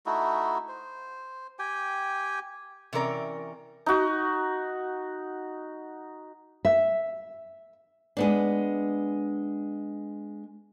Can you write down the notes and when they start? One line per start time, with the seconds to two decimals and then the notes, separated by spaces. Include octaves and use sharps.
0.06 A3 D#4 E4 F#4
0.69 C5
1.59 G4 G5 G#5
2.93 C3 E3 C#4 A#4 D5
3.86 D#4 F#4
6.65 E5
8.17 G#3 B3 D4